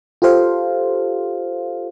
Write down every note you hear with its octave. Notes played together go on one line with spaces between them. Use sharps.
F4 G4 A4 C5 F5